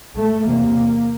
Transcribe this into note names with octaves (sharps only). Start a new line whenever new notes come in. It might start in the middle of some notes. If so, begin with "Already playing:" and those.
A3
E2 C3 A#3